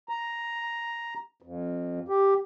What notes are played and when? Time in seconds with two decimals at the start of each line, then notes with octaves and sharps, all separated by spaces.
0.09 A#5
1.42 F2
2.08 G4